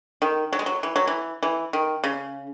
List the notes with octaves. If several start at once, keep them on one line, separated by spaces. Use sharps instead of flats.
D#3
F#3
G#3
F#3
E3
F#3
E3
E3
D#3
C#3